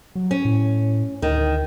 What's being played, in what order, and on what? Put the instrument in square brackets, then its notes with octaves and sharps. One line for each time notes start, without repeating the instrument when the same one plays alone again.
[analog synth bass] F#3
[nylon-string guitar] C#4
[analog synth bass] A2
[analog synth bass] D2 [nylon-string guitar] D#3